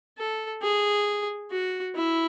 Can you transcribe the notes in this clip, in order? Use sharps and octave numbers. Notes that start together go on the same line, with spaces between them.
A4
G#4
F#4
E4